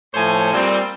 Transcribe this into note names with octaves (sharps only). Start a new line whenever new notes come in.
A2 F3 A3 C5 C#5 G#5
A#2 G3 C4